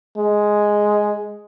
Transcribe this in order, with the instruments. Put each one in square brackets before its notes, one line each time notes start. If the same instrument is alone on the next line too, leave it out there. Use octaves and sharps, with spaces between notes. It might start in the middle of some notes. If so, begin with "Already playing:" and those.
[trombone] G#3